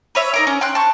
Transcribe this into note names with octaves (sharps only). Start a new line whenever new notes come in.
B4 C#5 E5
D#4 A#4 D6
C#4
G5 C6 F#6
A5 C#6